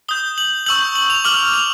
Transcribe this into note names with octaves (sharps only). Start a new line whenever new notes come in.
D#6 G6 G7
F#7
C#6 E6 G6 F#7
F#7
F7
D6 F6 F#7
F7